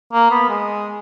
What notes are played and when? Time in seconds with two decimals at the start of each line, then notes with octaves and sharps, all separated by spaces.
0.13 A#3
0.31 B3
0.49 G#3